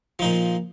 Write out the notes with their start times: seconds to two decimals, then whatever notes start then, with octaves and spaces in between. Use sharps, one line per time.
0.19 F3
0.22 D#4
0.25 A#2